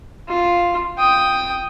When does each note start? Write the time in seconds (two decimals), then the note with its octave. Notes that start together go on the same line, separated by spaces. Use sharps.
0.28 F4
0.98 G5 D#6